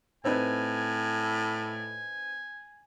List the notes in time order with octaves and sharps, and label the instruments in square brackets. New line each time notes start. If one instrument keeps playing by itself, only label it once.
[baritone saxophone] A2 [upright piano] C4 D#4 B4 [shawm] G#5